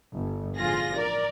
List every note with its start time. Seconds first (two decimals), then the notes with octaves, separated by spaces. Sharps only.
0.18 G1
0.58 A1 D3 F3 F4 G#4 A#6
0.94 A#4 D5